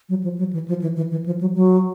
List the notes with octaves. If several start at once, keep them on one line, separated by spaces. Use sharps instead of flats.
F#3
F3
F#3
E3
F3
E3
E3
E3
F3
F#3
F#3